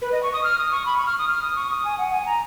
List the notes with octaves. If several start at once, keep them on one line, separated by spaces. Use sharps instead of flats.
B4
D#5
C#6
D#6
F6
D#6
C#6
B5
C#6
F6
D#6
F6
D#6
C#6
D#6
G#5
F#5
G#5
A#5